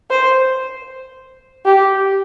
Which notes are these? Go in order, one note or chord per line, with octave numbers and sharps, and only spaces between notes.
C5
G4